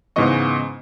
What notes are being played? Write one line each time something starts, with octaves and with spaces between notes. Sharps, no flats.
G#2 C#3 E3 B3 D#5 C#6